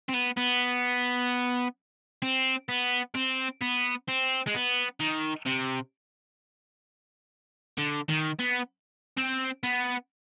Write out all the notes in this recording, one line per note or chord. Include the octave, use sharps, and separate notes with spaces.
C4
B3
B3
C4
B3
C4
B3
C4
G#3
B3
D#3
C3
D3
D#3
B3
C4
B3